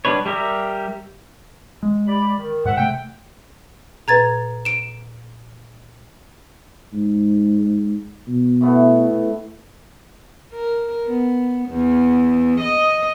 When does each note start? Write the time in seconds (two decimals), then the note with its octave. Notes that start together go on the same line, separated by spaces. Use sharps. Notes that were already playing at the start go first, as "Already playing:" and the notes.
0.05 G3 D4 B4 C#5
0.26 G3 G4 A#4 E5
1.83 G#3
2.07 G4 D5 B5
2.38 D#3
2.65 G#2 E5 F#5
2.77 C3 A3 G5
4.08 A#2 B4 A#5 G#6 A6
4.65 D7 E7
6.93 G#2
8.27 B2
8.61 A2 A3 B3
10.53 A#4
11.06 B3
11.69 E2
12.60 D#5